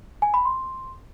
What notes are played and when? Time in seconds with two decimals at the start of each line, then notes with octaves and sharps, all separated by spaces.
0.22 G#5
0.34 B5
0.45 C6